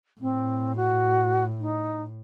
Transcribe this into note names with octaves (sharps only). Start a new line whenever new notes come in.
A2 C4
F#4
D#4